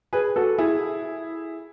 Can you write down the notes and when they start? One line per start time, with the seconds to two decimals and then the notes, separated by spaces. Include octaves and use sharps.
0.13 G#4 B4
0.36 F#4 A4
0.58 E4 G#4